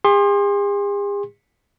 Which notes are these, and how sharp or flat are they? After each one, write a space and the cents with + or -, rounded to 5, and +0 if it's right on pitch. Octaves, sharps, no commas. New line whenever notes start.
G#4 -45 C6 +25